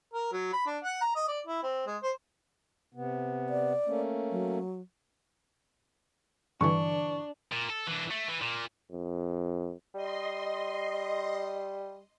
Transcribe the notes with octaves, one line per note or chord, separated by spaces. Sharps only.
A#4
F#3
B5
D4
F#5
A#5
D#5
D5
E4
C4
G#3
C5
C3 B3
D5
A3 A#3 C#4
F#3
G2 D3 E3 D4 C#6
A#2
A4
E3 D4
A3
E3
A#2
F2
G3 D#5 C6